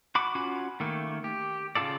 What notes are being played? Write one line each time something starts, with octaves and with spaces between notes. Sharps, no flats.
F#4 B5 D6
C#4 F4 F#4 B5
D#3 A3 A#3
G4
C#3 F3 F4 A4 D5